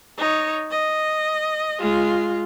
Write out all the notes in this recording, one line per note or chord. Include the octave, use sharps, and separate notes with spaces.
D#4 C#5
D#5
G#3 F4